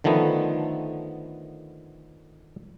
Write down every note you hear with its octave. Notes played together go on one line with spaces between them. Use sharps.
D3 D#3 F3 A3 B3